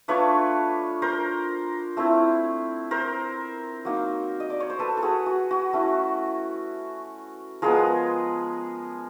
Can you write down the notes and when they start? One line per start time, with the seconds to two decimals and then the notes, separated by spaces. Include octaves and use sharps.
0.08 A3 D4 F4 B4 C#5
1.02 A#4 C5
1.97 A3 C4 E4
2.91 A#4 C5
3.85 F#3 A#3 D#4
4.40 D#5
4.50 D5
4.60 C#5
4.70 C5
4.79 A4 B4
4.97 A4
5.02 F#4 G#4
5.26 F#4
5.51 F#4
5.73 A3 C#4 E4
7.62 F3 G#3 B3 G#4 A#4